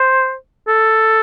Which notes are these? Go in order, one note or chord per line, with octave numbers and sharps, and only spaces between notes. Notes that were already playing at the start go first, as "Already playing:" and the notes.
Already playing: C5
A4